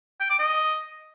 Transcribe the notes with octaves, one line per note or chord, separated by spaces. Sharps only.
G5
D6
D#5